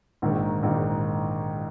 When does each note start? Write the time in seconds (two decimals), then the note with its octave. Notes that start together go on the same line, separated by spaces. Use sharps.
0.22 A#1 G#2 D#3
0.63 A#1 G#2 D#3